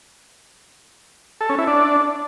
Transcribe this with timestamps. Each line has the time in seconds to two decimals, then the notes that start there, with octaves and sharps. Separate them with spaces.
1.41 A4
1.50 C#4
1.58 E4
1.67 D4